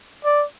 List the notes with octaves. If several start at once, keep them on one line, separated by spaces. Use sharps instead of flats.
D5